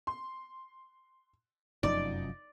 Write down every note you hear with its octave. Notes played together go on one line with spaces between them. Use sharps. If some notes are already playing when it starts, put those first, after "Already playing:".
C6
F1 F#2 F3 D#4 D5